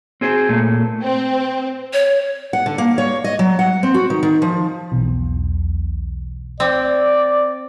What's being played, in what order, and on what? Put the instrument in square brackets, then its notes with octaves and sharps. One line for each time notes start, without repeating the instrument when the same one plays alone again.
[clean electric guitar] C4 G#4 C5
A#2 A3
[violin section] C4
[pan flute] C#5
[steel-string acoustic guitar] F#5
D3
A#3
C#5
D#5
F#3
F#5
C4
F#4
D#3
D#3
F3
[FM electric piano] B1 E2
[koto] C4 [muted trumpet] D5